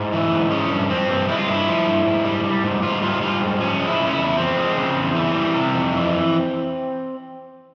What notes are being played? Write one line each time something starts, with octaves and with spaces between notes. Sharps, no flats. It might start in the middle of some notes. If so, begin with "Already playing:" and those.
Already playing: G#2 E4
E3
G#2
G#3 C#4
G2
F3 C4
G2
G#3 E4
F4
G2 E4
F3
G2
G#2
G3
G3
G#2
G#2 F4
G3 F4
G3 F4
G#2
F3 C#4
G#3
E4
C#3
C#4
E4
E2
F3 C4
G#3
C#3
E2
E3
G3
C3
F2
E3